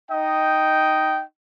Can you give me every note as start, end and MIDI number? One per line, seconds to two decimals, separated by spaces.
0.10 1.24 63
0.10 1.24 75
0.10 1.24 79